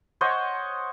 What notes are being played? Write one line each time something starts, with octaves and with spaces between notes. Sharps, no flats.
C5 C#5 D#5 F#5